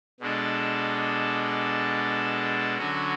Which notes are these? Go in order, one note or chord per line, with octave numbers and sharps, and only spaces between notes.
B2 G#3 D4 A4
D3 F#3 C#4 F#4